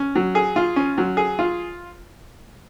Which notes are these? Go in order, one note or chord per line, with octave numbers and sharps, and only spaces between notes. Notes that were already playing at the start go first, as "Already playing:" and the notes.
Already playing: C#4
F#3
G#4
F4
C#4
F#3
G#4
F4